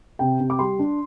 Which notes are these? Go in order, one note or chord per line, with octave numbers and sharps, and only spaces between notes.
C3 G5
C3
D6
G3 C6
D4